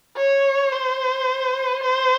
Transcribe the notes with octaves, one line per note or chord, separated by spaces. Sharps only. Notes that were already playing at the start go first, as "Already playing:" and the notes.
C#5
C5
C5